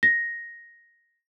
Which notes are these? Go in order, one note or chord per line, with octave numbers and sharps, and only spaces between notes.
A#6